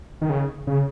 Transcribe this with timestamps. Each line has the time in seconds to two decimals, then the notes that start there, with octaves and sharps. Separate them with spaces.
0.21 D#3
0.30 C#3
0.67 C#3